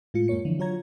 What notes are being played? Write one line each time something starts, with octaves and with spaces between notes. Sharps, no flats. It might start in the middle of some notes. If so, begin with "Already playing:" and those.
A2 G#3 F4 C#7
F#2 G#3 A#3 C#5 C#7
D3 E3 F3
F#3 F4 C#5 A#5 G#6